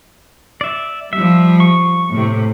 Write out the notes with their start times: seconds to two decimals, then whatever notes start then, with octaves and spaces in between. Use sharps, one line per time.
0.61 D5 E5
1.13 F3 G3 E5
1.60 C#6
2.12 A2 C3